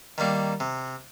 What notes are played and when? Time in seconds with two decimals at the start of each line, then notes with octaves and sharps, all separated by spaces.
0.18 D#3 G3 A#3
0.60 C3